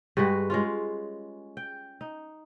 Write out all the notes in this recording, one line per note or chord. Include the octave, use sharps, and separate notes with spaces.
G2 G#3 F#4 B4
G#3 C#4 F4
G5
D#4